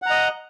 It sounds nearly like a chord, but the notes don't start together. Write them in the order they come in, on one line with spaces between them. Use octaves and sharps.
F#5 A#5 D#5